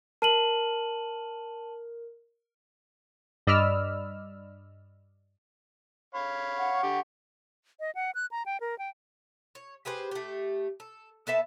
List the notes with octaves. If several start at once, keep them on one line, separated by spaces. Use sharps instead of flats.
A#4 A5 D#7 F#7
G2 D5 D#5 B5 E6 F6
C#5 F5 B5
F#5 C#6
D3 G4
D#5
F#5
F#6
A#5
G5
A#4
G5
C#5
G4 G#4 B4 C5
A3 G4
A4
B3 A4 E5 A5